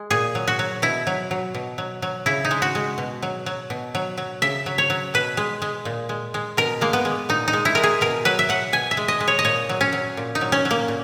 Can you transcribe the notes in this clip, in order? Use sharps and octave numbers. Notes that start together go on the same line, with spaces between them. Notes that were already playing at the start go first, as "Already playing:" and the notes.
Already playing: G#3
A#2 G#4
F#3
F#4
F#3
B2 E4
F#3
F#3
B2
F#3
F#3
C#3 E4
D#4
G#3
F#4
G#3
B2
F#3
F#3
B2
F#3
F#3
C#3 E5
F#3
C#5
F#3
B2 B4
G#3
G#3
A#2
G#3
G#3
B2 A#4
G#3 A#3
B3
G#3
A#2 D#4
D#4
G#3
E4
G#3 A#4
G#4
B2 A#4
F#3 B4
E5
F#3 F#5
B2 G#5
E5
G#3
D#5
G#3
C#5
D#5
A#2 C#5
F#3
C#4
F#3
A#2
D#4
F#3
C#4
F#3
A#3
A#2